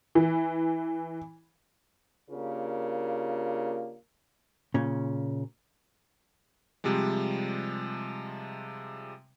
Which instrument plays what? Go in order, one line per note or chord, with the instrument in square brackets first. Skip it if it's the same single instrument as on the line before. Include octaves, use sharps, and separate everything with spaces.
[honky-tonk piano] E3
[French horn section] C#3 A#3 D4 F4 G4 A#4
[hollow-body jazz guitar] A#2 C#3 C#4
[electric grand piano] C3 F3 G3 G#3